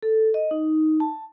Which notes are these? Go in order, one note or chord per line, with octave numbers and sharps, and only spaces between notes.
A4
D#5
D#4
A5